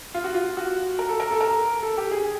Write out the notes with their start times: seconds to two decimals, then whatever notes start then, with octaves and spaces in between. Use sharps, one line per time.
0.14 F4
0.24 F#4
0.34 F4
0.57 F#4
0.99 A#4
1.09 A4
1.20 A#4
1.31 A4
1.41 A#4
1.82 A4
1.98 G4
2.11 G#4